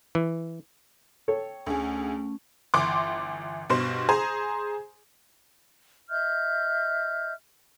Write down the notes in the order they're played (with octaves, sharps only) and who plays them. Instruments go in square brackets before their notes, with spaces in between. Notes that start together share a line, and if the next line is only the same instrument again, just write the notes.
[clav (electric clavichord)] E3
[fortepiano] A4 C#5 [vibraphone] G5
[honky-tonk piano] D2 G#4 [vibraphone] A3 C#4
[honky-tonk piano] G1 E3 C6 D6
G2 B2 C5
G#4 C5 G#5 A#5
[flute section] D#5 E5 F6 G6